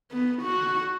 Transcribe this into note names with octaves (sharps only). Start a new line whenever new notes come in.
B3
F#4